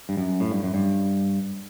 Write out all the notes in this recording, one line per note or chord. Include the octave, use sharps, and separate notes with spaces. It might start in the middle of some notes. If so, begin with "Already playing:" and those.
G2
F#2
A2
G2
F#2
G2